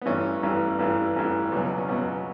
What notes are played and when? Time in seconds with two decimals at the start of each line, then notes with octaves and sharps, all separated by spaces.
0.02 B3
0.06 A1 G2 E3 C#4
0.43 A1 G2 E3
0.79 A1 G2 E3
1.16 A1 G2 E3
1.52 C#2 B2 F#3
1.78 C#4
1.89 C#2 B2 F#3 B3